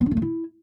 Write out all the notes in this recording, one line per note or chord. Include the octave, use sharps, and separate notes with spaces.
B3
D4
A3
F4
E4